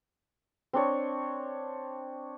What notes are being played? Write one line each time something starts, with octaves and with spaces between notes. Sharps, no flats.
C4 D4 C#5